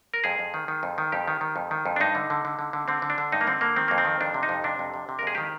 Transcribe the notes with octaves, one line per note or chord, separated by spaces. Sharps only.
A#4
F2 G#4
F2
D#3
D#3
F2
D#3
F2 G4
D#3
D#3
F2
D#3
F2
D4
G2 D#4
D3
D3
D3
D3
D3
D3 C4
D3
D4
D3
G2 D#4
A#3
D3 C4
D3 A#3
D#3 C4
F2 A#3
C4
D#3
F2 D4
C3
D#4
F2
C3 D4
F2
C3
C3
A#4
F2 G#4
D#3 G4